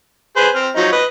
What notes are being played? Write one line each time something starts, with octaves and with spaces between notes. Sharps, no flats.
G#4 B4 C5
C4 F6
F3 F#3 D#4
B4 D#5